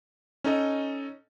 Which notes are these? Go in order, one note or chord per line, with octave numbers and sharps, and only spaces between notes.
C#4 D#4 A4 D#5